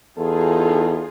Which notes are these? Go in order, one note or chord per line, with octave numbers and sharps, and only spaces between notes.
E2 D#4 F4 G#4 A4